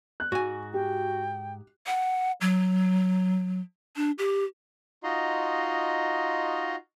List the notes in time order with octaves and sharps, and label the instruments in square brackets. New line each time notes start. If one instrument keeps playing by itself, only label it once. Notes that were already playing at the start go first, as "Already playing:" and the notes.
[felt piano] F#6
[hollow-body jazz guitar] G#2 G#5 [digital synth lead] F#4
[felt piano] G4 [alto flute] G5
[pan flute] F#5
F#3
D4
G4
[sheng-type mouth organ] D#4 F4 F#4 D#5 A#5 C6